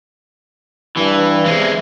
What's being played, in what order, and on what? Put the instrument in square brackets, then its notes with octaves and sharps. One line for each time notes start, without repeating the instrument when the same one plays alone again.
[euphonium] G2 [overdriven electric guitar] E3
[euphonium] C3 [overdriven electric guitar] E3 G#3